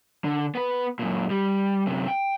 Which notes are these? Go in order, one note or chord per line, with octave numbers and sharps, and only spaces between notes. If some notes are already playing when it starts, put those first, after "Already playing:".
D3
B3 B4
F#2 A#2
G3
F#2 C3
G5